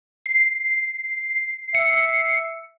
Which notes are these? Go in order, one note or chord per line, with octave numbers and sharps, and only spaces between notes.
C7
E5 C#7